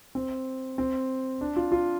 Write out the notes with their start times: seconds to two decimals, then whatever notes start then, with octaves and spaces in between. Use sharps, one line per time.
0.15 C4
0.78 C4
1.41 D4
1.56 F4
1.72 F4